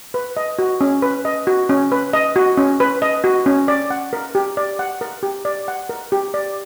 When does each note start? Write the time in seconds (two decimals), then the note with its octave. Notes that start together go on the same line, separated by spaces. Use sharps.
0.14 B4
0.37 D#5
0.59 F#4
0.81 C#4
1.02 B4
1.25 D#5
1.47 F#4
1.69 C#4
1.92 B4
2.13 D#5
2.36 F#4
2.57 C#4
2.80 B4
3.02 D#5
3.24 F#4
3.46 C#4
3.68 D5
3.90 F#5
4.13 A#4
4.35 G4
4.57 D5
4.79 F#5
5.01 A#4
5.23 G4
5.45 D5
5.68 F#5
5.89 A#4
6.12 G4
6.34 D5